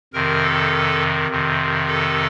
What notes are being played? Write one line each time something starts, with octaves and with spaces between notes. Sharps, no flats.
F2 C3 D#3 A#4
A4
F2 C3 D#3
A4